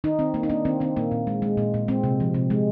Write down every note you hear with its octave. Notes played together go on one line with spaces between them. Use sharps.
D#3 D#4
D#3 C4
A#3
D#4
A#3 D4
D#3 C4
D#3 C4
A#2 A#3
A#2
G#3
G#3
A#2
A#2
G#3 C4
C3
F3
C3
G#3